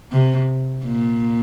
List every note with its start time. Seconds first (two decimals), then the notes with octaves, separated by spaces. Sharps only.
0.12 C3
0.84 A#2